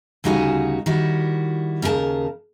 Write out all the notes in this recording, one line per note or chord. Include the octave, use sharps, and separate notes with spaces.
D2 C#3 G3 D#4 F#4 G#5
D#3 G3 E4 F#4
D#2 C#3 G4 A#4 A5